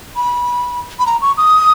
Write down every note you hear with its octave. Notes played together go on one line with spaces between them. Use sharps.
B5
B5
A#5
C#6
D#6